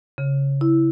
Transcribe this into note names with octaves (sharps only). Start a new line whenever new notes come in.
C#3
E4